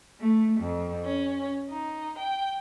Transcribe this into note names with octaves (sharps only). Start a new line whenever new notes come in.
A3
F2
C#4
D#4
G5